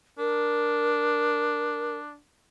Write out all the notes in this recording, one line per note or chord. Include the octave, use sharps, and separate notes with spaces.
D4 A#4